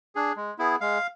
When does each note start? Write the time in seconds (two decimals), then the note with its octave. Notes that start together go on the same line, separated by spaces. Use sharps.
0.15 D4 G#4
0.36 G#3
0.59 B3 E4 G#4
0.81 G#3 F5